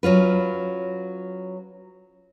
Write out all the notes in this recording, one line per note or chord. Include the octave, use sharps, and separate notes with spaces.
F#3 C#4 F4 B4